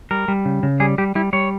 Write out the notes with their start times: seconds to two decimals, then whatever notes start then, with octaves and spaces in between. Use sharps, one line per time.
0.11 G3 A#4
0.28 G3
0.45 C#3
0.63 C#3
0.80 G3 G#4
0.98 G3 G4
1.15 G3 E4
1.33 G3 C#5